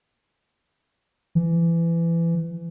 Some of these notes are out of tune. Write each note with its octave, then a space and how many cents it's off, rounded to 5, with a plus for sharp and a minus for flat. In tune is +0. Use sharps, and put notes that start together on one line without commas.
E3 +25